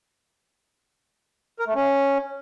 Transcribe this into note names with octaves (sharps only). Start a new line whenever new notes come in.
A#4
A3
C#4